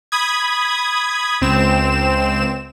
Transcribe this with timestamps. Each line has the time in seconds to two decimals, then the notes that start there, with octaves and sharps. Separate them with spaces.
0.12 B5 D#6 G#6
1.41 C#2 C4 E7